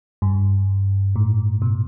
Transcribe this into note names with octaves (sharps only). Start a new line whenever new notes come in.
G2
A2
B2